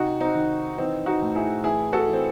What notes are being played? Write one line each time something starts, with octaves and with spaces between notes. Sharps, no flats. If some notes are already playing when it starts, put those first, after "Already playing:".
Already playing: C3 D#4 F#4
C4 D#4
D#3
E3 C4 D#4
D#4 F#4
A2
E4 G#4
E3 E4 G#4
F#4 A4
E3
C4